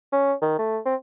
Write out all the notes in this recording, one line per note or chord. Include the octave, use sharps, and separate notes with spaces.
C#4
D#3
A3
C4